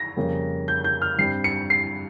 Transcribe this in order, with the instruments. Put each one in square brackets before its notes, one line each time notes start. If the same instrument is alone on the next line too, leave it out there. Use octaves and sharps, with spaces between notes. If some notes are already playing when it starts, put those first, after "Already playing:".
Already playing: [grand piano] A#6
F2 C#3 G3 A#3
G6
G6
F6
G2 G3 C4 C7
C#7
C7